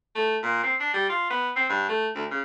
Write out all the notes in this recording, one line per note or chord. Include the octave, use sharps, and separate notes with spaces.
A3
A#2
C4
D4
G3
F4
B3
C4
G2
A3
D2
C#3